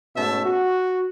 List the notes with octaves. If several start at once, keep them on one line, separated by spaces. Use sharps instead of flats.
G#2 B2 A3 C#4 E5 A5
F#4